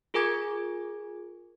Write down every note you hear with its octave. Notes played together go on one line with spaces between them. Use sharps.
F4 G#4 A#4 G#5 D6 G#6